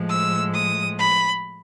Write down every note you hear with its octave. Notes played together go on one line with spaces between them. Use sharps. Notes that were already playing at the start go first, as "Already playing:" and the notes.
Already playing: A2 F3 G#3
E6
D#6
B5